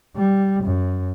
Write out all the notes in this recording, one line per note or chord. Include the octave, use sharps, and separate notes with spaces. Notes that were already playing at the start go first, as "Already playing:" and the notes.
G3
F#2